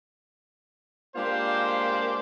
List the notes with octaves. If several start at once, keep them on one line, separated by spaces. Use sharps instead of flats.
G#3 A#3 D4 F4 G4 C5